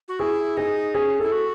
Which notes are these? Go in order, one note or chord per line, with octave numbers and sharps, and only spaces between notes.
F#4
E4 G#4
D#4 G#4
C#4 G#4
E4 A4
F#4